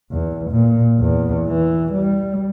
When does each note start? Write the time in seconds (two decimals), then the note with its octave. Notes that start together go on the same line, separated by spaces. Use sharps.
0.11 E2
0.51 A#2
1.00 E2
1.47 E3
1.92 G3